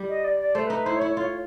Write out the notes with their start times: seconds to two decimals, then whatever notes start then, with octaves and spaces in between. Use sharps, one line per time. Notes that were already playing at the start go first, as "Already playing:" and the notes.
Already playing: G3
0.09 D#5
0.24 D5
0.40 D5
0.55 A3 C5
0.65 B4
0.70 D#4
0.75 B4
0.86 E4 C5
0.96 C#5
1.01 E4
1.07 C#5
1.17 F4 C#5